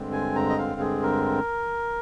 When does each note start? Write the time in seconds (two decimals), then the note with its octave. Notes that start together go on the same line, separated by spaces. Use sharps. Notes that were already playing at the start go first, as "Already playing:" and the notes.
Already playing: G2 D3 G#3 C4
0.12 G#5
0.36 A#5
0.49 D#5
0.58 F5
0.80 G#4
1.03 A#4